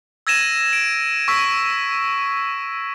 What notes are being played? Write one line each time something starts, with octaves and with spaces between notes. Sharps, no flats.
E6 G#6 A#6 D#7 E7
D7
C#6 E6 B6 D#7